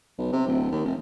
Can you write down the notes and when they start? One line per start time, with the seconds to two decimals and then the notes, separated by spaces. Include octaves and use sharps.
0.18 B1
0.32 C3
0.47 D1
0.72 D#2
0.85 F1